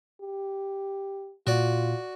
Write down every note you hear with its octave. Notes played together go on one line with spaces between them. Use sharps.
G4
A#2 F4 F#4 D5